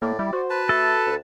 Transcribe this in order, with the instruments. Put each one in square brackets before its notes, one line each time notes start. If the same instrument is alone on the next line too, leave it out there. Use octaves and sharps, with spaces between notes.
[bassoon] A2 [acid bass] A#3 [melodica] D5
[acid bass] G3 [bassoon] E4
[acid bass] F#4 [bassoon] C5
[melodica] B4 A5
[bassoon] A3 [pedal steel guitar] A4
[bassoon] D2